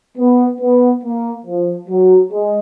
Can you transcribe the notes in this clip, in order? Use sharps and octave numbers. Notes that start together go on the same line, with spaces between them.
B3
B3
A#3
F3
F#3
G#3